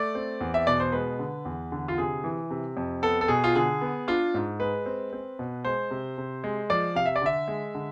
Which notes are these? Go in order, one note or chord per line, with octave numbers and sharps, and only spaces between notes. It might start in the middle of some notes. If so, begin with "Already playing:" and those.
Already playing: A3 D5
C4
E2
E5
B2 D5
C5
G#3 B4
D3
E2
D3
F4
C3 G#4
E3
C3
F2
B3 A4
A4
B2 G#4
F4
D3 G#4
B3
D4 F4
G#2
G#3 B4
C4
C4
B2
G#3 C5
C3
C3
G#3
F3 D5
C3 F5
E5
D5
D3 E5
G#3
D3